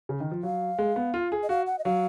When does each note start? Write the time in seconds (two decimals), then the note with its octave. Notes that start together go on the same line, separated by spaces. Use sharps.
0.09 C#3
0.20 D#3
0.31 F3
0.43 F#3 F5
0.78 G#3
0.96 B3
1.14 F4
1.32 G#4
1.43 D#5
1.49 F#4 F5
1.67 F#5
1.79 D#5
1.84 F#3 F5